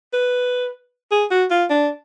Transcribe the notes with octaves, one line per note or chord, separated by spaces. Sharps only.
B4
G#4
F#4
F4
D4